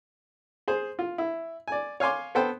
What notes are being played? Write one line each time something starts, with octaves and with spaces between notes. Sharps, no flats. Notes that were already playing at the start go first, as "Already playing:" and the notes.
G#4 C5
F4
E4
D5 G#5
C#5 F5 G#5 C6 D6
B3 A4 C5 G5